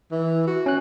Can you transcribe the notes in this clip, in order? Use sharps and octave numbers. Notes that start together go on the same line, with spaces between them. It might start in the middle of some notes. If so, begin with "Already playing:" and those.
E3
F#4
C#4 F#6